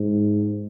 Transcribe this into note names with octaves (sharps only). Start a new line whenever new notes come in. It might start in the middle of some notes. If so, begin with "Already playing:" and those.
Already playing: G#2